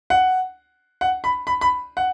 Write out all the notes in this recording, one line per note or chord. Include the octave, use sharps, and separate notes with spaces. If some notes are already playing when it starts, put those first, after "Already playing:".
F#5
F#5
B5
B5
B5
F#5